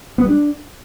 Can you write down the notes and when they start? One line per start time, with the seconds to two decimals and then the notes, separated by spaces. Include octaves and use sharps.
0.18 B3
0.23 G3
0.29 D4